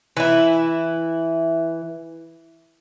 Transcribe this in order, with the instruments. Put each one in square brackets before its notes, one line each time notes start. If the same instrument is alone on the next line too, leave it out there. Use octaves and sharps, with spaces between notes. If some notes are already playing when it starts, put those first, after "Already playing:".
[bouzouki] E3 E4